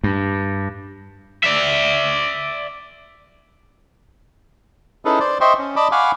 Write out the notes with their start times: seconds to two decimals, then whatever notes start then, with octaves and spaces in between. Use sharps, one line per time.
0.04 G2
1.43 D5 E5
5.05 C#4 D#4 E4 G#4 A4 B4
5.20 C5 D5
5.41 C5 D#5 E5 G5 C6 C#6
5.58 C#4
5.76 D5 D#5 A5 B5 D6
5.92 F5 F#5 G#5 B5 C#6 D6